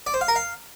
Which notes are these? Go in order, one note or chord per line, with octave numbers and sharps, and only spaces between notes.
D5
C5
F5
A#4
F5